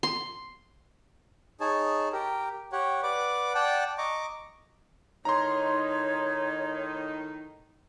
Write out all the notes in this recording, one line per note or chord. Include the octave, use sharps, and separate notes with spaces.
C6
D#4 G#4 C#5 A5
G4 A#4
G4 C#5 F#5
B4 D5 F#5 D6
D5 F#5 G5 A5
D#5 A#5 C#6 D6
A2 D#3 D#4 C#5 A#5 C6